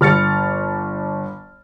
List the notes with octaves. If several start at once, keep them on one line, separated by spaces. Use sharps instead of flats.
G1 F6 A6 C#7